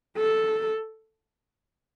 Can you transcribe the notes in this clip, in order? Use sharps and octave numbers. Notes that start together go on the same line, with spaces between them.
A4